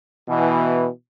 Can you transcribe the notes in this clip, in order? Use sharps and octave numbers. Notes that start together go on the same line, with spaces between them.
B2 E3